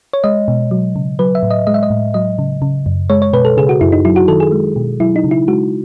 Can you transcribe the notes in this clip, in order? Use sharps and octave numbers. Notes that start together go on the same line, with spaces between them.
C#5
G#3 D#5
B2
F#3
C#3
F#3 B4
E5
A2
D#5
G#3 D#5
E5
D#5
A2
F#3 D#5
C#3
C#3
F#2
G#3 C#5
C#5
B2 B4
A4
C#3 G#4
F#4
F#2 E4
D#4
F#3 E4
F#4
D#3 A4
G#4
G#3
B2
F#3 E4
D#4
C#3
E4
G#3 F#4